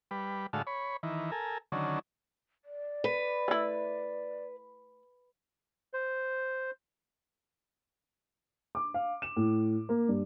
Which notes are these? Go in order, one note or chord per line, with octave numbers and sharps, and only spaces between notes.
G3 B4
A2 D3 G#3 F#4 F5 A5
C#5 B5
D#3 E3
A4 A#4 G#5
D3 D#3 F#3 C#4
D5
B4
A3 E4
C5
D6
F5
E7
A2
A#3
G2